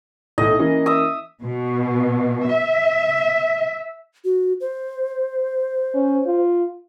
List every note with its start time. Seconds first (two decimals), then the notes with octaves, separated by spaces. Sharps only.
0.38 B1 A2 D#5
0.59 E3 A#3 C#4
0.86 E5 D#6
1.42 B2
2.52 E5
4.25 F#4
4.60 C5
5.94 C#4
6.26 F4